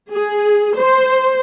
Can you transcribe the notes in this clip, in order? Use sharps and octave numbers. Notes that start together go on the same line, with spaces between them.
G#4
C5